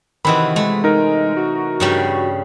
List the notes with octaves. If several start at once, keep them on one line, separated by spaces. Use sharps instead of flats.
C3 D#3 E3 F#4 D#5 B5
G#3 A3
D#4 A#4
F#4
G2 C#3 G3